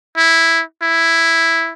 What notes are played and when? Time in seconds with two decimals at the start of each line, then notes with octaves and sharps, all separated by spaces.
0.17 E4
0.82 E4